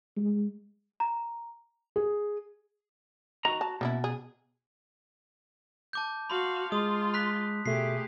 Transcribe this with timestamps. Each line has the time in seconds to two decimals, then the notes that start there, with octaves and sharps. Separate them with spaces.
0.17 G#3
1.00 A#5
1.96 G#4
3.45 D#3 F#4 A#5
3.61 A5
3.81 B2 A#3 C#4 E4
4.04 G#4
5.93 A5 D6 G6
6.30 F#4 F5 B5 C6
6.72 G#3 F4 C6 D#6
7.14 B5 F#6 B6
7.66 B2 A3 G4 G#4 C7